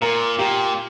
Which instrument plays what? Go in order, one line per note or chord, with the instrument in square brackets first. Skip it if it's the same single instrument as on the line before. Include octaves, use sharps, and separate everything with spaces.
[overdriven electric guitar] A#2 [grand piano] A#4
[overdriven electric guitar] A#2 [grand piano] G4